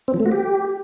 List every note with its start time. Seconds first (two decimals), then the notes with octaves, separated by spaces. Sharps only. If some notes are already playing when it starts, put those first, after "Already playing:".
0.08 C4
0.14 F3
0.20 A3
0.26 F#4
0.32 G4